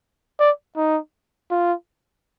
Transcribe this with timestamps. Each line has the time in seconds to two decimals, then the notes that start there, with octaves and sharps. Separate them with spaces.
0.40 D5
0.76 D#4
1.51 F4